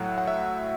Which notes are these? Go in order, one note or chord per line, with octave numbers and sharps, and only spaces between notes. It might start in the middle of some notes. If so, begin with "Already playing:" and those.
Already playing: A2 F#3 A3 F#5
F#5
E5